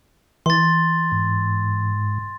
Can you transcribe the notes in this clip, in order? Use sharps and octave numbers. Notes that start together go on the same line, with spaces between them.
E3 C6 A6
G#2